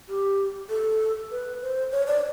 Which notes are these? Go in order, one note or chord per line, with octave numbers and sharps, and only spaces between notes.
G4
A4
B4
C5
C#5
D5